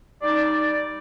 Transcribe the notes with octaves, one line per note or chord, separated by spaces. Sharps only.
G3 D#4 D5